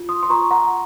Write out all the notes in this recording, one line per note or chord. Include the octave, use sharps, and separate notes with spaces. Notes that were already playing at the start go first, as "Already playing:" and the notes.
Already playing: F4
C6 D#6
C6
F4 A#5 C#6
F#5 A#5